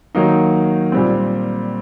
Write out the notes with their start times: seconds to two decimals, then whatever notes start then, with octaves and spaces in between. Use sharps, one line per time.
0.15 D#3 F#3 A#3 D#4
0.92 A#2 G3 C4